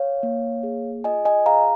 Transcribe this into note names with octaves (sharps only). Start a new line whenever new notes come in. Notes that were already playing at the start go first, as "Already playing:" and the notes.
Already playing: C#5 F5
A#3
G#4
F4 D#5 G#5
D#5 G#5
G#4 F5 A#5